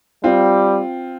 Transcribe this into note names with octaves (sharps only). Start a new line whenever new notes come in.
G3 C4 F4